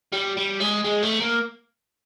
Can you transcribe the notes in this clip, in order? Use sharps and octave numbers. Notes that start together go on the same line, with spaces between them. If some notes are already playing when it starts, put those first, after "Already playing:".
G3
G3
G#3
G#3
A3
A#3